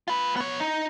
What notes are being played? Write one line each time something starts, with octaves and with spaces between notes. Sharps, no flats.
F4 B4
B3 C#5
D#4